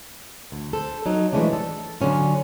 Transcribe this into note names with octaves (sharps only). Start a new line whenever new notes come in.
D2
A4 C5
F#3 D#4
E3 F3 G#3 A3 C#4 D4
A4
D3 F#3 C#4 F4